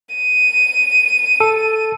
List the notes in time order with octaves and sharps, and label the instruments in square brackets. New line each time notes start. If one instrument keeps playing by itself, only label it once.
[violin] D#7
[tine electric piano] A4